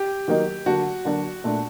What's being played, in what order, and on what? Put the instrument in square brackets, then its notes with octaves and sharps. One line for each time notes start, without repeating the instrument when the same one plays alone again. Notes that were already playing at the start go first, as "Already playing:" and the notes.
Already playing: [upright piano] G4
[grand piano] D#3 F#3 A#3 D#4
[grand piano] D3 F#3 A#3 D4 [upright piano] F#4
[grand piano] D3 F#3 A#3 D4
A#2 A3 D4